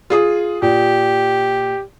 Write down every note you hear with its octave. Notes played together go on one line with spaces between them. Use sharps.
F4 G#4 D#6
A#2 G4